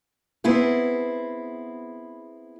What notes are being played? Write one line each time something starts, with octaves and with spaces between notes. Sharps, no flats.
B3 C4 E4 G#4